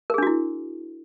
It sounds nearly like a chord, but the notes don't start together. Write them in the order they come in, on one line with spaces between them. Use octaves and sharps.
A#4 G#4 D4 F#4 E4